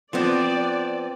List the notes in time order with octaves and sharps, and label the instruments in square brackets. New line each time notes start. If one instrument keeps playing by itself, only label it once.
[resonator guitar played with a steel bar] F3 B3 C4 [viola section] D5